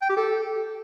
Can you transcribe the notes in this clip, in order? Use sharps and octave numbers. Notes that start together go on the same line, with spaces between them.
G5
G4
A4